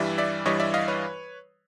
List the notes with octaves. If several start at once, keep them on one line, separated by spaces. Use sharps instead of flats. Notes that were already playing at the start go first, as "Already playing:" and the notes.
Already playing: G2 E3 G3 D5 E5
D5 E5
G2 E3 G3 C#5 D#5
D5 E5
D#5 F5
B4 C#5